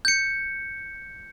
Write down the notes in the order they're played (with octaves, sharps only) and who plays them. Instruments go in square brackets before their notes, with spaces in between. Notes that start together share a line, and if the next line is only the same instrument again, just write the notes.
[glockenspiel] G6 C#7